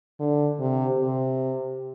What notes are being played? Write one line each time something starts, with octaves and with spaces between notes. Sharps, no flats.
D3
C3
C3